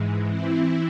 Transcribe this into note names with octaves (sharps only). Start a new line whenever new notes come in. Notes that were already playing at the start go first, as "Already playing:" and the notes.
Already playing: G#2 E3 G#3
E3 C4 E4